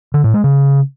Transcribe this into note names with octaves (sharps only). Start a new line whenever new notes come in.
D3
A2
G#3
C#3